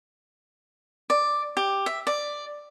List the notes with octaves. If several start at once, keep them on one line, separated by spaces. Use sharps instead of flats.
D5
G4
E5
D5